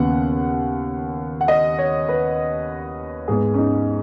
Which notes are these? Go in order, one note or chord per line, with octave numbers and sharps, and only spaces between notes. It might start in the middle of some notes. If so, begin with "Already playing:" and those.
Already playing: D#2 C#3 B3 F#5
F#5
D#5
C#5
B4
G#2 G#3 B3 G#4
C#4
D#4